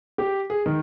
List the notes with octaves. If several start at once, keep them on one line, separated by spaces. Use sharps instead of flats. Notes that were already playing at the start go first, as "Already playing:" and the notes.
G4
G#4
D#3